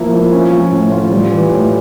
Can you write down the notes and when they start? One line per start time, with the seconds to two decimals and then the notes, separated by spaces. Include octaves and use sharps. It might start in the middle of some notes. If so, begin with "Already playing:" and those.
Already playing: F3 A#3 E4
0.13 F3
0.33 C#4
0.53 F3
0.72 A2
0.92 F4
1.11 G3
1.31 E3
1.51 A2